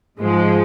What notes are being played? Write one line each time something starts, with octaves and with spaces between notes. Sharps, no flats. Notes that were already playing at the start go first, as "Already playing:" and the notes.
G#2 F3 G#3